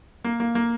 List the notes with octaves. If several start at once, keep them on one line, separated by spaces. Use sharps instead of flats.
A#3
A#3
A#3